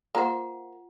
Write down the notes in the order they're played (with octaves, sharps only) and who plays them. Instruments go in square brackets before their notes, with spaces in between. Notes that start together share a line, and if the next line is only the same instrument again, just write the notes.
[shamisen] A#3 C5 [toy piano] F4 F#5